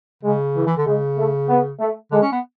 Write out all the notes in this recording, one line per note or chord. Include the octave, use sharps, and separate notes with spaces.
C#3 G#3
E3
E3
D3
C#3 G#3
A3
B3
A3
D3 G#3
C#4
B3